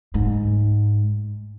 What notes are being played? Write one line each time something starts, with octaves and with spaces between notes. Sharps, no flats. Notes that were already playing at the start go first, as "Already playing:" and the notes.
G#2